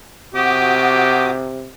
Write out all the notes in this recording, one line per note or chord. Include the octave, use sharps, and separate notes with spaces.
C3 F#4 G4 D6 D#6